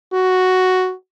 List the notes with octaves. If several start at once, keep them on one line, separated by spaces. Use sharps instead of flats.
F#4